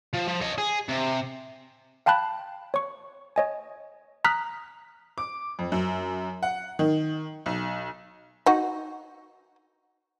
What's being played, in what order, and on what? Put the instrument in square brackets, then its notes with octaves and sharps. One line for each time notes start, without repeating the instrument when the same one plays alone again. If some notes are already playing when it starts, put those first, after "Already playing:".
[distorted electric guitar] F3
F3
C#5 D#5
G#4
C3
[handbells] F5 G5 A5 B5 F#6
C#5 C#6
C#5 D#5 G#5
A#5 D#6 F6 F#6 B6
[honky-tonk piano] D6
F2
F#2
F#5
D#3
B1
[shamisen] D#4 F#4